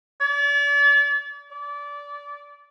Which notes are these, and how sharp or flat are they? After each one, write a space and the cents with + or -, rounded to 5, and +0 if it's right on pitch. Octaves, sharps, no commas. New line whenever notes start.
D5 -40
D5 -25